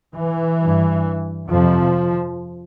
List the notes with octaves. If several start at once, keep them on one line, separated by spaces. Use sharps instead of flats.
E3
G2
F2 C3 F3